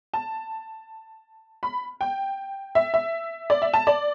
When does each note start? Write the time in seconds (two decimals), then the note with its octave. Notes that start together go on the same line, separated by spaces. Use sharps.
0.13 A5
1.63 B5
2.01 G5
2.75 E5
2.94 E5
3.50 D5
3.62 E5
3.73 A5
3.87 D5